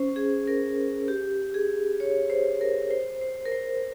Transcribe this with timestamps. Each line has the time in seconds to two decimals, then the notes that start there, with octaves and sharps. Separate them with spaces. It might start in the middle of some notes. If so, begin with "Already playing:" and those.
Already playing: C#4 C5
0.16 G#4
0.48 A#4
1.08 G4
1.54 G#4
2.00 C#5
2.30 C5
2.61 A#4
2.91 C5
3.21 C5
3.46 A#4
3.52 C5